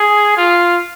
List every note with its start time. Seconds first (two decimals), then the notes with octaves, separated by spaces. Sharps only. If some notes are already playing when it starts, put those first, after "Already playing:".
Already playing: G#4
0.37 F4